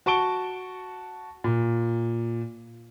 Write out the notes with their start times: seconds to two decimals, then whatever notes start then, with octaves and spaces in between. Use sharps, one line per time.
0.06 F#4 A5 C#6 D7 G7
1.44 A#2